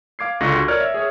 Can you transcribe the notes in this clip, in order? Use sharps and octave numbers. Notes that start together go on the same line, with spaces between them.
F5 D6 G#6 C7
C#2 D3 F4 C#6 D6 A#6
F#4
A#4 C#5 D5 F6 G#6
E5
G#4 C#5 E5